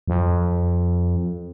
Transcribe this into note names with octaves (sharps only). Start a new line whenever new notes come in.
F2